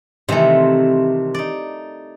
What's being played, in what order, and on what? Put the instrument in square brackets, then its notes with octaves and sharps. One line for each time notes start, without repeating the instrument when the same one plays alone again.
[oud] C3 [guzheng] D#3 E3 A3
[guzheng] D#4 D5